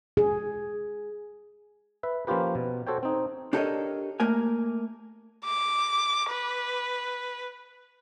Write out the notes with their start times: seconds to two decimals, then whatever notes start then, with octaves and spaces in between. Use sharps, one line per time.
0.17 G#4
2.03 B4 E5
2.27 F3 A#3 C#4 F4 G4 B4
2.55 B2
2.87 F#4 A4 C5 C#5 G5
3.03 C4 D#4
3.53 D4 G4 A4 A#4 C#5 D#5
4.20 A3 A#3 A#4 G#5
5.44 D6
6.30 B4